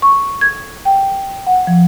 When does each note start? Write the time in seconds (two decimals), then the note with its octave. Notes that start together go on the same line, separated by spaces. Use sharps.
0.02 C#6
0.41 G#6
0.85 G5
1.47 F#5
1.67 F3